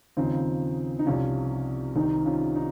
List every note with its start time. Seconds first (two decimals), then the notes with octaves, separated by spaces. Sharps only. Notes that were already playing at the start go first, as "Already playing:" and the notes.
0.17 D#2 C#3 F3 C4 D#4
0.99 D#4
1.06 C2 C3 F3 C#4 F4
1.96 C2 C3 D#3 C4 D#4
2.26 C#4 F4
2.55 D#4